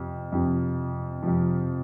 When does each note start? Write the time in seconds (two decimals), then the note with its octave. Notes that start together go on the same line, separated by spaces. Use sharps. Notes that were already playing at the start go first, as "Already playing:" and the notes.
Already playing: F2 C3
0.32 F2 C3 F3
1.23 F2 C3 F3